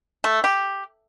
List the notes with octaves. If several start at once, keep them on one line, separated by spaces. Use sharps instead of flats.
A3
G4